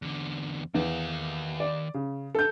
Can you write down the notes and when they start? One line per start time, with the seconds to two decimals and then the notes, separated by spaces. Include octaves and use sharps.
0.02 E2 D3
0.74 E2 D#3 F5
1.60 D5
1.94 C#3
2.35 A4 G6